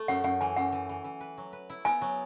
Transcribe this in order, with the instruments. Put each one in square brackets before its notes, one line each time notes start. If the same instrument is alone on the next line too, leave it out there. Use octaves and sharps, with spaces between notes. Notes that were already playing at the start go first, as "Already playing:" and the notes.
Already playing: [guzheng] A3
[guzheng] F#2 [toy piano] F#5
[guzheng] F#2 [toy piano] F#5
[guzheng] E3 [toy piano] G#5
[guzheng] F#2 [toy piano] F#5
[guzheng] E3
E3
E3
B4
F#3
B4
E4
[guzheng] B3 [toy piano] G#5
[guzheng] F#3